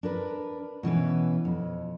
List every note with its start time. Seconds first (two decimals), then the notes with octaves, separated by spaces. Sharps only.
0.03 D4 A#4 B4
0.83 B2 E3 C#4 B4
1.45 F2